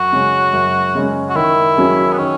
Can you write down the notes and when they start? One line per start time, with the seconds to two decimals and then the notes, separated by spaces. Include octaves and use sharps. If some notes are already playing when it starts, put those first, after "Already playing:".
Already playing: F#2 F#4
0.12 C#3 G#3 C#4
0.53 F#2
0.95 C#3 G#3 C#4
1.29 F#4
1.35 D#3 E4
1.77 F#3 C#4 G#4
2.13 B3
2.18 D#3 C#4